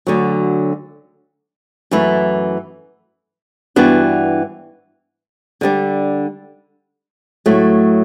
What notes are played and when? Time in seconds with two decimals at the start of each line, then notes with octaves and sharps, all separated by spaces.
0.07 D2 D3 F#3
1.91 F#2 E3 A3 E4
3.76 G2 E3 B3 D4 F#4
5.61 D3 G3 D4
7.46 A2 F#3 A3